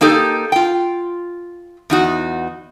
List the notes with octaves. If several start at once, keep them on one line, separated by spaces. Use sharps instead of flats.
A#3 D#4 G4 A4
F4 G5
E2 D#4 F#4